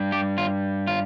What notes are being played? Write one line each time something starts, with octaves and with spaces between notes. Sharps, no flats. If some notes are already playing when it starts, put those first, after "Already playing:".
Already playing: G2 G3
G4
F4
F4